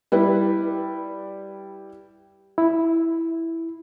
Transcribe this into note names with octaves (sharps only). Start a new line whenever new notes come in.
G3 E4 B4
E4